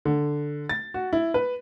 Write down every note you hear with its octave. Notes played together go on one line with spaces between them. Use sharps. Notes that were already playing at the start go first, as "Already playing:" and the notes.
D3
A6
F#4
E4
B4